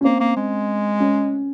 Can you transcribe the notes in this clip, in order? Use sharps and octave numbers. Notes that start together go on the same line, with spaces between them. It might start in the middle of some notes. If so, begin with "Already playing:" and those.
C#4
A#3 C4
A#3
G#3
C#4